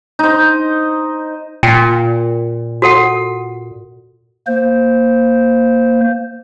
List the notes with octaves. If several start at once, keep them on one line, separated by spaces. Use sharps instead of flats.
D#4 C5
A#2 G5
F#4 A4 F#5
A#3 C5